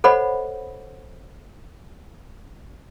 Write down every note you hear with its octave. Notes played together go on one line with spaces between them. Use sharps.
A4 C5 C#5 D#5 F#5 B5